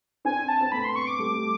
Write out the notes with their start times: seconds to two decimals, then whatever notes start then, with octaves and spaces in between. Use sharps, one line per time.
0.25 C4 D4 G#5
0.48 A5
0.61 C4
0.72 A3 B3 B5
0.84 C6
0.96 C#6
1.07 D6
1.19 G3 A3
1.35 G3 A3